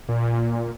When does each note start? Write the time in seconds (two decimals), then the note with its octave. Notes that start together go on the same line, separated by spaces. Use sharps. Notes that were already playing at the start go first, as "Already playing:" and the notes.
0.09 A#2